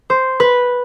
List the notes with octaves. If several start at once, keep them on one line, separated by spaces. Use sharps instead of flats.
C5
B4